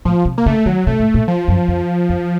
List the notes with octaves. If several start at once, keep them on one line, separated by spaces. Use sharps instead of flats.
A2 F3
C3
A#3
C#3 A3
D#3 F#3
C3 A3
A2
A#2
F3
F#2
F2
F2